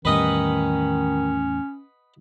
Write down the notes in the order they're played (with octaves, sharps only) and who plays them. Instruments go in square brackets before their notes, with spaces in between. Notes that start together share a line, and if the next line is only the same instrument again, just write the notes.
[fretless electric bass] E2 A2 G3 [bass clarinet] D#3 [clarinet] C#4 [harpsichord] B4 D#5 F#5